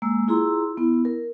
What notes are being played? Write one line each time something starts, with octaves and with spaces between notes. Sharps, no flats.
G#3 A#3 E6
E4 F4 G#4 A#5 C6 E6
B3 E4
A#4